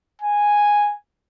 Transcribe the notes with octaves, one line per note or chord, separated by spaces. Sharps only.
G#5